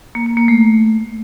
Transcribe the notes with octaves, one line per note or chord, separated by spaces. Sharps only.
A#3
A#3
A#3
A3